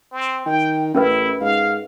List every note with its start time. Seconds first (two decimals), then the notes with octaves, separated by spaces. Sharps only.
0.12 C4
0.46 D#3 G5
0.95 A1 C#4 E4 A#4 B4
1.41 G#2 F5